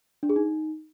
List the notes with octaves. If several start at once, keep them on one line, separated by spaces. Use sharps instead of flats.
D4
G#4
D#4